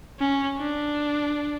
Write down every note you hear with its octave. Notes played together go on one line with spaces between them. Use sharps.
C#4
D4